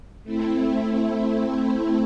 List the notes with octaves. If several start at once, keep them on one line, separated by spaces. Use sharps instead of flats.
A3 C4 E4